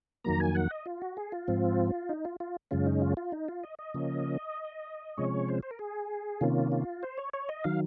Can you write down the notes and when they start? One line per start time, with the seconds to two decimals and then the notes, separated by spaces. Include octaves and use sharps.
0.24 F2 D#3 F#3 A#3 A#5
0.40 G#5
0.55 F#5
0.71 D#5
0.86 F4
1.02 F#4
1.17 G#4
1.32 F4
1.48 G#2 F3 C4
2.09 D#4
2.25 F4
2.40 F4
2.71 F#2 C#3 G#3 C#4 F4
2.86 D#4
3.02 F4
3.17 F4
3.32 D#4
3.48 F4
3.63 D#5
3.79 D#5
3.94 C#3 F3 A#3 C#4
5.17 C3 F3 G#3 C#4 C#5
5.49 C5
5.63 C5
5.71 A#4
5.79 G#4
6.41 C3 D#3 A#3 C#4 F4
6.72 F4
7.03 C5
7.18 C#5
7.33 C#5
7.49 D#5
7.64 D#3 F#3 F5